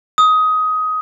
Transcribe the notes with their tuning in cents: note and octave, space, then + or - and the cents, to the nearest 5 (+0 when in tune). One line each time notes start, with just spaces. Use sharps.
D#6 +15